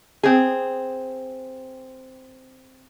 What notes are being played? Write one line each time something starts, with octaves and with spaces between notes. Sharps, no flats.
C4 G#4